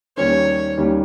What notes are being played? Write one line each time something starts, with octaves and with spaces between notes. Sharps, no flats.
D#2 D#3 G3 C#4 C#5
D#2 D#3 G3 C#4